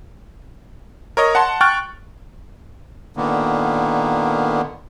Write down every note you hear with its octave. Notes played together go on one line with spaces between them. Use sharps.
A#4 C#5 D#5
F#5 A5 C6
G5 C#6 F6 F#6 A6
A#2 D3 D#3 A#3 B3